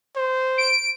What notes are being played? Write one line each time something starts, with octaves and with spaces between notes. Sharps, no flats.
C5
D7